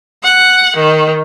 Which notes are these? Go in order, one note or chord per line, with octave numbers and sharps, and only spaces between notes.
F#5
D#3